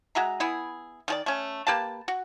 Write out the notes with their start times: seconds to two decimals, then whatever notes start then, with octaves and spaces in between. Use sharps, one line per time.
0.15 G#3 F#4 E5 A#5
0.40 B3 E4 G#4
1.08 D#3 G#4 D5
1.26 A3 C#4
1.67 A#3 G4 B4 A5
2.08 F#4